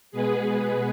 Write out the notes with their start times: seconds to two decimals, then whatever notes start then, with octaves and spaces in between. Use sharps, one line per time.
0.11 B2 G#3 B3 G#4 B4
0.44 G#4 B4